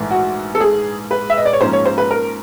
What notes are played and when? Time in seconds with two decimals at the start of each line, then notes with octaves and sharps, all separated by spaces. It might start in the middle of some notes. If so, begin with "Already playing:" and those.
Already playing: A#1 G#2 E3 A3
0.11 F#4
0.55 A4
0.61 G#4
1.11 B4
1.30 E5
1.38 D#5
1.45 D5
1.53 C#5
1.61 G#2 F3 A#3 C#4 C5
1.73 C#5
1.86 C5
1.98 B4
2.11 A#4